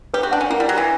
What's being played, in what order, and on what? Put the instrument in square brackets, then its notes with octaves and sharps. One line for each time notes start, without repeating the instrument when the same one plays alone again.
[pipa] G4 [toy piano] B4
[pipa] F#4
[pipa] D4 [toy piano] F#5
[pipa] C#4
[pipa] A#3 [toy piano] E4
[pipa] G3
[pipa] F#3 [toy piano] E4
[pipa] E3